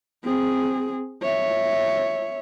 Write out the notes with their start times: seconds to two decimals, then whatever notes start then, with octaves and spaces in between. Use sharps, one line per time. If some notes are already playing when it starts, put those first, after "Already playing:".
0.24 C4 G#4
1.22 C#5 E5